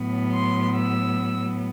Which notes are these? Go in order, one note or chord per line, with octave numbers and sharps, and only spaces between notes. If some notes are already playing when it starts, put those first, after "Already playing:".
Already playing: A2 F#3 B3
C6
E6